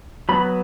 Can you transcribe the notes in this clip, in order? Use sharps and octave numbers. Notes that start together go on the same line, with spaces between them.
F#3 B3 B5